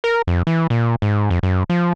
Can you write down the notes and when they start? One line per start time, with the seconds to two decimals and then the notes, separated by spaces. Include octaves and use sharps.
0.04 A#4
0.27 F2
0.47 E3
0.70 A#2
1.02 G#2
1.30 F2
1.43 F#2
1.70 F3